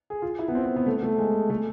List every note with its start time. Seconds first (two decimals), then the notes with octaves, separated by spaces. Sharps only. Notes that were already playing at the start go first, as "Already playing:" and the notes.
0.10 G#4
0.22 F4
0.39 E4
0.48 B3
0.55 C4
0.66 C4
0.76 B3
0.86 A3
1.03 A3
1.18 G#3
1.50 A3